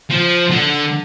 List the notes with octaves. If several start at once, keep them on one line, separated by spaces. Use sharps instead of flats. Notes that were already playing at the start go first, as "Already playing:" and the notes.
F3
D3